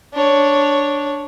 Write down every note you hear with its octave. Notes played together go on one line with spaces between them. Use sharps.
D4 C#5